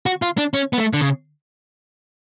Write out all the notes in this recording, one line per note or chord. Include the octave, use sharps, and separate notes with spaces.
F#4
F4
D4
C#4
B3
A3
D3
C#3